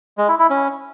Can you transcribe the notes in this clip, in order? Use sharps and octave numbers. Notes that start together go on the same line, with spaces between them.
G#3
E4
E4
C#4